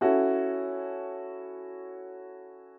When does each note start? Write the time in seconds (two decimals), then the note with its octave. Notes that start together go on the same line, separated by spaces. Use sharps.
0.01 C#4 E4 F#4 A4